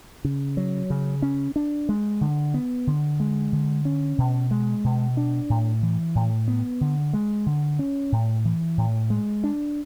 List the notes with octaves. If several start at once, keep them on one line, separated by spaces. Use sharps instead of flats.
C#3
F#3
C#3
C#4
D4
G#3
D3
B3
D3
G#3
D3
C#4
B2
G#3
B2
D4
A2
E3
A2
B3
D3
G#3
D3
C#4
A2
E3
A2
G#3
D4